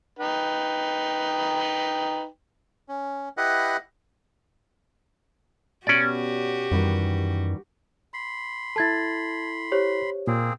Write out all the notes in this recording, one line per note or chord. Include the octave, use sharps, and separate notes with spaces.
D#4 B4 G5
C#4
E4 G4 B4 D#5 F#5
B2 C#4 F#4 G4 D5
F#2 D#3 E3 G3
B5 C6
E4 A4 A5 G#6 A6
G4 C5 C#5
A#2 A#3 C4 G#4